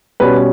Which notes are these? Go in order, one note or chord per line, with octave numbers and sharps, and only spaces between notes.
B2 G3 C#4 B4